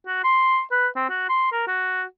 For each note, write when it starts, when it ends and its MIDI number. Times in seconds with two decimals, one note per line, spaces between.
0.07 0.19 66
0.24 0.61 84
0.71 0.87 71
0.96 1.06 60
1.09 1.27 66
1.29 1.51 84
1.52 1.66 70
1.67 2.04 66